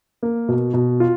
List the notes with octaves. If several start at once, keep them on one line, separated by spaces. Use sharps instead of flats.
A#3
B2
B2
F4